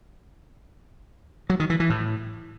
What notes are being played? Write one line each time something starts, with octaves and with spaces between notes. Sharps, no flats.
F#3
D#3
E3
E3
A2